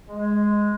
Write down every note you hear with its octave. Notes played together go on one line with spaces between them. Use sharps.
G#3